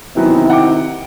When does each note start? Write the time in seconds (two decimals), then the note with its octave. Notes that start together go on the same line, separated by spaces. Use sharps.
0.16 C3 D#3 E3 F#3 B3 E4
0.49 F#5 G5 D6